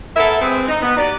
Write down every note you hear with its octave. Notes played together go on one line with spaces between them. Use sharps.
B3 E4 A4 A#4 E5
G#3 B3 C4
D#4
B3
D#4 F#4 G4 D5